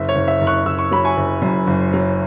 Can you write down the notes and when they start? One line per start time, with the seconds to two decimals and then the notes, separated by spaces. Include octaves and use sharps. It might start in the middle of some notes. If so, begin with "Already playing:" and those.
Already playing: F#1 E5
0.09 C#5
0.15 F#1
0.28 E5
0.41 F#1
0.47 C#6 F#6
0.66 F#1 E6
0.79 C#6
0.91 F#3 B5
1.05 G#5 C#6
1.17 F#1
1.42 F#2
1.67 F#1
1.93 F#3